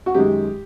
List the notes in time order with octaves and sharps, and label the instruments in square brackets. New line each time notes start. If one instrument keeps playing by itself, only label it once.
[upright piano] F#4
F#2 D#3 G#3 G4